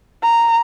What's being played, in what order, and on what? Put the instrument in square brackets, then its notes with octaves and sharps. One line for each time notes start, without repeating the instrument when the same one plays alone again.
[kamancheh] A#5